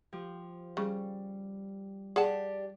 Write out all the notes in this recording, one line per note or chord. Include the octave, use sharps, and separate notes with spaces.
F3 G4
C#3 G3
D4 G4 G#4 F#5 A5